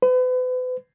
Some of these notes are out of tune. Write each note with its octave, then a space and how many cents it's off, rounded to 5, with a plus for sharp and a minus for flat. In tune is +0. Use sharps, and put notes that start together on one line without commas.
B4 +40